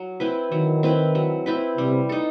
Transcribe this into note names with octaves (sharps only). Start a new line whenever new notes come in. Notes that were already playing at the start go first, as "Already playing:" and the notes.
Already playing: F#3
C4 E4 B4
D#3 F#3
C4 E4 B4
F#3
C4 E4 B4
C3 G3
D#4 A4